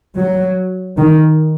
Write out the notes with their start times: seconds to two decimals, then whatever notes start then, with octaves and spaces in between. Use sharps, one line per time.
0.17 F#3
0.99 D#3